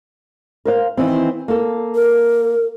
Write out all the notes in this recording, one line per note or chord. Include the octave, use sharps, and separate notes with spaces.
A#4 C5 F5
D#3 E3 C4
A#3 A4
A#4